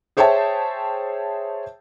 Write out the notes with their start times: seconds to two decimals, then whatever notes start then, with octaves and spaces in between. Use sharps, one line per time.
0.17 G#4 C5 C#5 E5 G5 A5